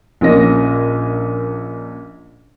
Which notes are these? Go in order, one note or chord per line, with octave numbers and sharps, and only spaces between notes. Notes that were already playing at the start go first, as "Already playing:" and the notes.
A#1 A#2 C#4 D#5 A#6